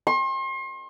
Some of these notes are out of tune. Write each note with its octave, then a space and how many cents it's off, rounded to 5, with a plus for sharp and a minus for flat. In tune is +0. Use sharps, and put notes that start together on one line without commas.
C6 +40